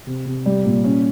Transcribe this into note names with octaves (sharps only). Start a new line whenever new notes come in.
C3
C3
G3
A#2
C#4